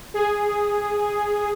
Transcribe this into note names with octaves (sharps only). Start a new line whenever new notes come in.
G#4